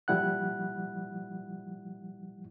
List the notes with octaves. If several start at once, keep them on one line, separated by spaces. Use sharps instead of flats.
A#2 F3 G3 E4 F#5 F#6